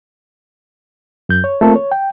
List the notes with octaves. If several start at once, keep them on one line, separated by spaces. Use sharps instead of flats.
F#2 G6
C#5
A3 A#3 C4 F4 A4 A#4
C#5
G5